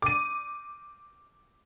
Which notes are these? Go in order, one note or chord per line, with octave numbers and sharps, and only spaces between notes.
D6 D#7